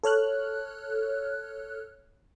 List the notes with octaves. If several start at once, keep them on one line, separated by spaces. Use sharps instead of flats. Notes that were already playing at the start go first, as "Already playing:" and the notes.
A4 C#5 F6 F#6